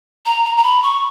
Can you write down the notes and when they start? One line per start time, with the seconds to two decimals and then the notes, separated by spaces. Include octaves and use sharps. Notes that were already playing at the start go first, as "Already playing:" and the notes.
0.26 A#5
0.45 A#5
0.57 A#5
0.63 B5
0.83 C#6